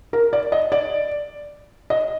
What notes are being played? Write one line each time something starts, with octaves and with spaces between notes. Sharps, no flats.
A#4
D5
D#5
D5
D#5